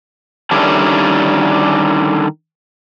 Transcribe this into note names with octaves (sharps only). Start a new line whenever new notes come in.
D3 D#3 G3 C#4 D4 E4